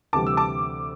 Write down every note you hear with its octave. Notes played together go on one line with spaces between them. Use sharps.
D2 C3 E3 G3 A5 D6
E6
A5 D6